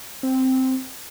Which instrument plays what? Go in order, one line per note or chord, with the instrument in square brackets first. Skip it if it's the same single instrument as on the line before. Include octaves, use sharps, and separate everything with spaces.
[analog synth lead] C4